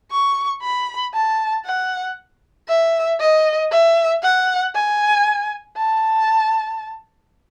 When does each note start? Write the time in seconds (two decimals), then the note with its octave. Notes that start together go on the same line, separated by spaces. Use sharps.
0.11 C#6
0.62 B5
1.14 A5
1.65 F#5
2.68 E5
3.20 D#5
3.71 E5
4.23 F#5
4.75 G#5
5.77 A5